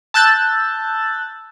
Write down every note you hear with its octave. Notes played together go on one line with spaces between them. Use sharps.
A5 E6 F#6 G6 A6